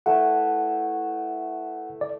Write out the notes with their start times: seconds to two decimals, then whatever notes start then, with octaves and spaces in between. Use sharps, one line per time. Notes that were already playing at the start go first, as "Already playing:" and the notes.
0.06 A3 E4 B4 F#5
2.01 D5